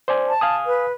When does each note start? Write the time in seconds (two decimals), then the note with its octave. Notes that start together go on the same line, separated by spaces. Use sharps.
0.08 C5 D5 G#5
0.29 A5
0.41 F5 G#5 D#6
0.66 B4